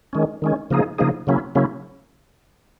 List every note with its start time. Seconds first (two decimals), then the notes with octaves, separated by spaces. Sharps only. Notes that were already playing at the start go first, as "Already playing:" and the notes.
0.13 D#3 G#3 C#4
0.42 D#3 G#3 C#4
0.71 C#3 F3 A#3 D#4 G#4
0.99 C#3 F3 A#3 D#4 G#4
1.27 C#3 F#3 A#3 C#4 E4
1.55 C#3 F#3 A#3 C#4 E4